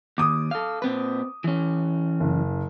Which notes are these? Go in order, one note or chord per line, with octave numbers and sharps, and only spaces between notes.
D#2 D6 D#6
A4 F5
A#2 C4 B4
E3 C#4
F#1